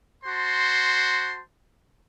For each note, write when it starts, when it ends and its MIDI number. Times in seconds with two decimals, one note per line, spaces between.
0.24 1.40 66
0.24 1.40 72
0.24 1.40 81
0.24 1.40 84